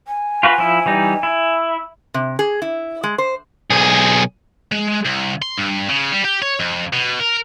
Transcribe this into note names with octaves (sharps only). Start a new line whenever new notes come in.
G#5
F4 F#4 B4
F3 E4
E3 G3 D#4
E4
C3
G#4
E4
G#3
C5
B1 G#4
G#3
C2
C6
G2
C#3
G3
G4
C#5
F2
B2
A#4